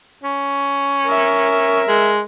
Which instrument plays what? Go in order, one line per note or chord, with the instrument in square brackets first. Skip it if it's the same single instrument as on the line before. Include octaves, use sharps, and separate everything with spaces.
[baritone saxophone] C#4
[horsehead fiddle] A#4 E5
[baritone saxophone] G#3